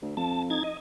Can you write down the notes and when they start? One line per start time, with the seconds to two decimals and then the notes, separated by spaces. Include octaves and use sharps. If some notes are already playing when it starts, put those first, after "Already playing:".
0.02 D2
0.17 F2 A5
0.50 D#4 G#6 A6
0.64 D#5